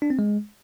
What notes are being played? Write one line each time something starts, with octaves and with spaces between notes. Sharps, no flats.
D4
C4
G#3